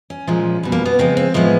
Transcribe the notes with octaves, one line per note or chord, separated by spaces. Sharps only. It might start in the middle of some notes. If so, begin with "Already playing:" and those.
C#4
A#2 F3 G#3
B2 G3
A#3
B3
C#3 F3 G#3 C4
C4
A2 F3 G#3 B3